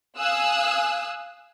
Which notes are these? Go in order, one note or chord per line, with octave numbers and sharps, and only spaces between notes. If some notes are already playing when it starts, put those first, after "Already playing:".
F5 G#5 D#6 E6 F#6